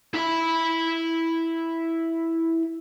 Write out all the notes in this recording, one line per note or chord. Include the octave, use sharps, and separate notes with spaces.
E4 B5